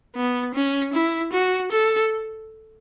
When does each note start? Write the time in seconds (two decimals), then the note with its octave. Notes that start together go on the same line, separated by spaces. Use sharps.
0.16 B3
0.55 C#4
0.94 E4
1.33 F#4
1.72 A4